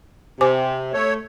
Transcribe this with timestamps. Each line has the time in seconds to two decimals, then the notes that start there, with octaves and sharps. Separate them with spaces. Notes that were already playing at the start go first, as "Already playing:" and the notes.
0.41 C3 C5 G#5 D6
0.94 A3 C#5